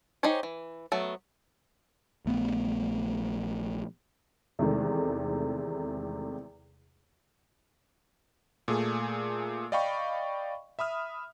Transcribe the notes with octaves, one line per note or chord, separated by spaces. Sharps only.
D#4 G4 G#4 C5 C#5
E3
F#3 A3 B3
A#1 A3 B3
E2 C3 D#3 G#3 A3
A#2 A3 G#4
D5 D#5 F5 G5 B5 C#6
E5 B5 D#6 F6